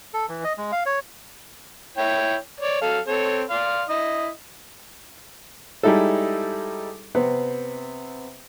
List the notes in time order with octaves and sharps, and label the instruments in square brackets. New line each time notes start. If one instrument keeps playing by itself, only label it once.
[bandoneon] A4
E3
D#5
G#3
F5
C#5
[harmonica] E4 C#5 G5
C#5 D5
F#3 A4 F5
C4 A4 C#5
D5 F5 C6
E4 D#5
[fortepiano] G3 G#3 D#4 E4 A4
C3 B3 C4